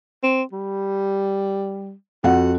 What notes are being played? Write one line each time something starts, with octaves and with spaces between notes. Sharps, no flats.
C4
G3
F2 F#4 F#5